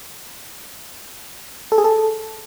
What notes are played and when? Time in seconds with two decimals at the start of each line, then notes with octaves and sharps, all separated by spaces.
1.72 A4
1.78 G#4
1.84 A4